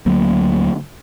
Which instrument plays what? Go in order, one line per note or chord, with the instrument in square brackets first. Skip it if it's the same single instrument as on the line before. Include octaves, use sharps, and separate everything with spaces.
[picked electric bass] D2 F#3 A#3